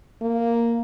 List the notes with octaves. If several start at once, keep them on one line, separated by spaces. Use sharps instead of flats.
A#3